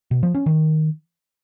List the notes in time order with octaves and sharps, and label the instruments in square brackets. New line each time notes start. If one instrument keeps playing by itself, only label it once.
[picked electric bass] B2
F3
C#4
D#3